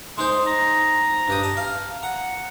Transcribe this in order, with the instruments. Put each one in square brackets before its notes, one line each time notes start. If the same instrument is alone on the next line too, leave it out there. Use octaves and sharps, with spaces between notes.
[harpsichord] G#3 D#4 C5 [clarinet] C6
[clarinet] A#5
[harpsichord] G2 G4 D#6
A5
F5
[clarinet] F#5 [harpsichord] A#5